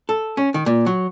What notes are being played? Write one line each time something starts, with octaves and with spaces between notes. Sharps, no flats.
A4
C#4
D#3
A#2
F#3